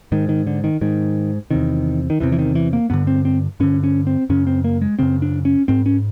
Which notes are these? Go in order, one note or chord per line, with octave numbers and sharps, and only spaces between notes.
G#2 D#3
D#3
D3
D#3
G#2 D#3
E2 C3 D#3
D#3
E2 C3 E3
E3
D#3
E3
A#3
G2 D3 B3
C4
C4
G2 D3 C#4
C#4
C4
F#2 C#3 C#4
C4
A#3
G#3
F#2 C#3 C4
D4
C#4
G#2 C4
C#4